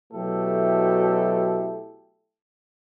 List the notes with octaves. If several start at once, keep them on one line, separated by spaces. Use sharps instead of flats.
B2 F#3 A3 E4 G4 A4